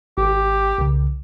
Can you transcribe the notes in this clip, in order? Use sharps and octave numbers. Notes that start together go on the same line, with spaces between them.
G#1 G4
C2 C#3